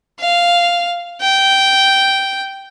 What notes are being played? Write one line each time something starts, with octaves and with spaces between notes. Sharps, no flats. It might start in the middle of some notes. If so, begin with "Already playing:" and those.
F5
G5